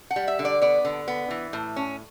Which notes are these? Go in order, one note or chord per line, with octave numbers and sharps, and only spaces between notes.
F#5
G3
E5
D3
D5
B3 D5
D3
B3
E3
A2
C#4